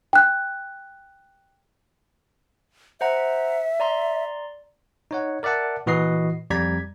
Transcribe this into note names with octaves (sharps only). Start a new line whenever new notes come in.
G5 F#6
C5 E5 F#5 A#5
D5 A#5 C6
D#4 C#5 F#5
A#4 D5 E5 F#5 A5
A#2 E3 F#4 B4 D#5 C7
F2 G3 D5 A#5 G#6 B6